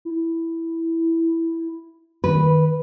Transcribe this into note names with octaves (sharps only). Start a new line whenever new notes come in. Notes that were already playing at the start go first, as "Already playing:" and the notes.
E4
D#3 B4